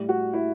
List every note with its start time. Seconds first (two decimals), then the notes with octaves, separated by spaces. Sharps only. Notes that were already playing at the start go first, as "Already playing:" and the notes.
Already playing: A2 G3
0.09 F#4
0.33 E4